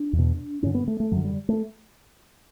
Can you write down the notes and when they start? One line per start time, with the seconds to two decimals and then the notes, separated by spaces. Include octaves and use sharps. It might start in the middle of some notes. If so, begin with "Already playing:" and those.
Already playing: D4
0.13 E2
0.18 B2
0.63 G2 D3 C#4
0.75 B3
0.88 A3
1.00 A3
1.12 F#2 D3 F#3
1.24 G3
1.49 A3